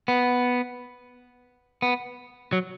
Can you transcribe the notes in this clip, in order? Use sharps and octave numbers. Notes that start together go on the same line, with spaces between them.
B3
B3
F#3